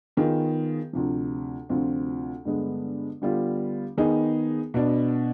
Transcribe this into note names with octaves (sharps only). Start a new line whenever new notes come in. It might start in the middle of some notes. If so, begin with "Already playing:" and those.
D#3 B3 F4 G#4
D2 C3 F3
D2 C3 F3 C4 F4
G2 D3 G#3 B3
D3 G3 B3 F4
D#3 B3 D#4 G#4
B2 B3 D4